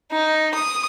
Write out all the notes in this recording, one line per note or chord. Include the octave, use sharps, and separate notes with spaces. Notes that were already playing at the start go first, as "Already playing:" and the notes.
D#4
D#6